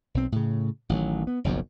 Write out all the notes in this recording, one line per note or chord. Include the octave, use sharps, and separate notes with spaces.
B1 C4
A2 C#3
A1 D#3 F3 F#3
B3
F#1 B1 F#2 F3